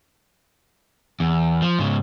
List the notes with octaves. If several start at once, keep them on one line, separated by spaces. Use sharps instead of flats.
E2
F3
G#2 C#3